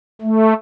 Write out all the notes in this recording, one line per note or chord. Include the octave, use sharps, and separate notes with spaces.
A3